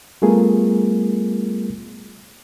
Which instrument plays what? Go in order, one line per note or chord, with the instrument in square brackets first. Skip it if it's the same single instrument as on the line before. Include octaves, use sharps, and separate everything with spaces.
[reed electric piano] G3 A3 B3 F4 G#4 A#4